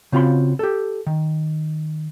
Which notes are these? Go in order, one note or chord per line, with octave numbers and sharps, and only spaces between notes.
C#3 C4 F4 F#4 B5 C6
G4 A4
D#3